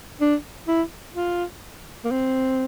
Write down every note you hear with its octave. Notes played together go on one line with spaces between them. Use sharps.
D4
E4
F4
A#3
C4